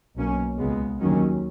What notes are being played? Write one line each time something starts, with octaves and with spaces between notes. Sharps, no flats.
B1 B2 A#3 C#4
C#2 C#3 G#3 B3
D#2 D#3 F#3 C#4